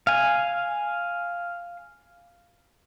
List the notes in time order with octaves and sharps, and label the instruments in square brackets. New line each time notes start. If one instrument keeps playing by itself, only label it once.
[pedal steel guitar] F5 G#5